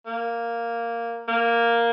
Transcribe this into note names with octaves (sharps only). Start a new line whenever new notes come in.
A#3
A#3